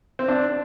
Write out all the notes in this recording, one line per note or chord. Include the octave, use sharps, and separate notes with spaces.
C4
D4